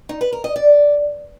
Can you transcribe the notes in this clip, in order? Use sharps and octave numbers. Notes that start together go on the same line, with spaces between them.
D#4
B4
A#4
D#5
D5